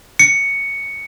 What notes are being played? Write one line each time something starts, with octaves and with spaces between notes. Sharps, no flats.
C#7